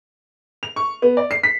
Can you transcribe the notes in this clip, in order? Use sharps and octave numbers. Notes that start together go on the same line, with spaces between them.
F7
C#6
B3
D5
C7
B6